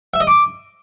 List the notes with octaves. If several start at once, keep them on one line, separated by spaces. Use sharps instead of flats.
E5
D#5
D6